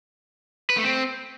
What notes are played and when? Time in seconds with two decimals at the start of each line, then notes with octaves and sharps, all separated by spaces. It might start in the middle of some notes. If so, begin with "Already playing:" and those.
0.70 B4
0.77 A3
0.84 C4